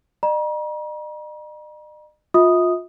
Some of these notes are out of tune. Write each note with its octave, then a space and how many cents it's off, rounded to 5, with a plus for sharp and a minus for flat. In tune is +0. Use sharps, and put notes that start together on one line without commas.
D#5 -45 A#5 +40
F4 +25 E5 -45 D#6 -5